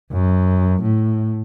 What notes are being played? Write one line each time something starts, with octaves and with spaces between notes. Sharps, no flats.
F#2
A2